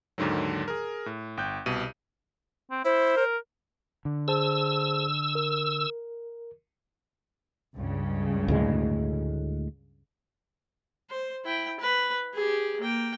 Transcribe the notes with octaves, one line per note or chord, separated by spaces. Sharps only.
D#2 G#2 D3 D#3 F#3
G#4 A#4
A2
G1 G5 F#6 G6
C2 B2 G4 D#7
C4
E4 C5
A#4
D3
G#4 C5 A5 E6
A#4
C#2 G2 C#3
D2 A2 G#3
C5
E4 G5
B4
G4 G#4
A#3 G5